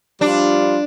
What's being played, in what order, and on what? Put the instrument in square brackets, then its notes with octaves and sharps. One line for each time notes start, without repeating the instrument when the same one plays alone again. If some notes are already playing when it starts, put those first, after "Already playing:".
[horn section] F3 G3 F4 [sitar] D4